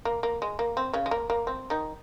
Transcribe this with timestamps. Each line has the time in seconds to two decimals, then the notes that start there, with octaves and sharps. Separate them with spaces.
0.05 A#3
0.23 A#3
0.42 G#3
0.59 A#3
0.77 C4
0.93 C#3 C#4
1.06 G#3
1.11 A#3
1.30 A#3
1.47 C4
1.70 D#3 D#4